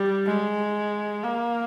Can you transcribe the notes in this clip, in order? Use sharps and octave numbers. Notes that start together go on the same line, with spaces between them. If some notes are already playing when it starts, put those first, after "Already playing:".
Already playing: G3
G#3
A#3